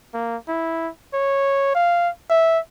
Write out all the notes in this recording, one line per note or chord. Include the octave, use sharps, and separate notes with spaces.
A#3
E4
C#5
F5
E5